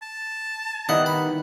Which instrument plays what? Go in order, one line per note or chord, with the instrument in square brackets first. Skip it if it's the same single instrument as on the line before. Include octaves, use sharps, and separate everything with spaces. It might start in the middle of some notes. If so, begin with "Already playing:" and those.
[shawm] A5
[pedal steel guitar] D#3 F#5 [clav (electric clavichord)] G3 B3 E4 [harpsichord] D#5
[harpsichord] B5